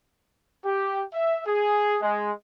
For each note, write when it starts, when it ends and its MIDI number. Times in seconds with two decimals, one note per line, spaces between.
0.65 1.04 67
1.14 1.41 76
1.47 1.97 68
2.02 2.31 56